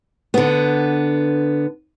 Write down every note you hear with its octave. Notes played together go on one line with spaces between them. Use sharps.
D3 B3